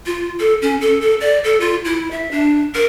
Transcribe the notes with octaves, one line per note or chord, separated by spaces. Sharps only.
F4
A4
C#4
A4
A4
D5
A4
F4
E4
E5
D4
A#4